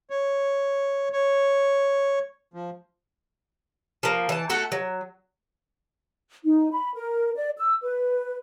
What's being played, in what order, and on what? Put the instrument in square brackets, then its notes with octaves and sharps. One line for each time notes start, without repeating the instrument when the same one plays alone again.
[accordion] C#5
C#5
F3
[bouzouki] F3 A#3
E3 A5
A3 F#4 A4
F#3
[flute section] D#4
B5
A#4
D5
E6
B4